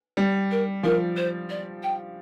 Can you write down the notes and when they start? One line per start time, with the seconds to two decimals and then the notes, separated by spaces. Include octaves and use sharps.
0.17 G3 D5
0.50 A#4
0.83 F3 A#4
1.16 C5
1.49 D5
1.82 G5